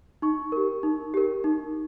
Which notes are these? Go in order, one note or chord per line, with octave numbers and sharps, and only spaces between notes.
D#4 C#6
G4 A#4
D#4
G4 A#4
D#4